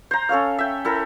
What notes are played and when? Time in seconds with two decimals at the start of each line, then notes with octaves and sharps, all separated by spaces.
0.11 C5 A#5
0.29 C#4 A4 C#5 F5
0.59 E5 G5
0.85 E4 A4 A#4